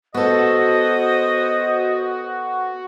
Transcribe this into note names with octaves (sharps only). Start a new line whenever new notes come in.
B3 F#4 A4 C5 D#5